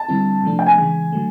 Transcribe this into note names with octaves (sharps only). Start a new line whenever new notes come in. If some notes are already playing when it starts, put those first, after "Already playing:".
Already playing: A5
D3 G3 C4 E4
C3 F3 A3 D4
G5
G#5
C#3 E3 G#3
D3 F#3 A3